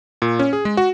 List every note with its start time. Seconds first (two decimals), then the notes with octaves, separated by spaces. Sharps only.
0.22 A#2
0.39 C#4
0.53 G#4
0.65 G#3
0.77 F#4